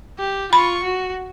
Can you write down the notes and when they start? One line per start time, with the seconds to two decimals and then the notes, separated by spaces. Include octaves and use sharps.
0.19 G4
0.53 F4 B5 C#6
0.84 F#4